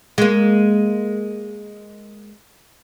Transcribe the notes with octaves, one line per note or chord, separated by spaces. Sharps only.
G#3 A#3